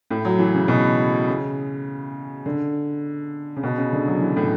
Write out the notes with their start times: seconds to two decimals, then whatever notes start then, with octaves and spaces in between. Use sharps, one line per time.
0.11 A2
0.25 F#3
0.39 E3
0.54 C#3
0.68 B2
1.28 C#3
2.46 D3
3.56 C#3
3.63 B2
3.78 C#3
3.93 D3
4.07 F#3
4.21 E3
4.36 A2